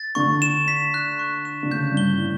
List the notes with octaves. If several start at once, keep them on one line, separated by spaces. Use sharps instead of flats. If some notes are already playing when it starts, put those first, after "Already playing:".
Already playing: A6
D3 C#6
E7
B6
F#6
C#6
E7
D3
C#3 G6
G2
G7
A2